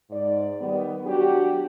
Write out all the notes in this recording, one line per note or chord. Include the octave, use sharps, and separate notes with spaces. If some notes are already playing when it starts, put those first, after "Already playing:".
G#2 D5
D#3 G3 B3
F#3 D4 F#4 G4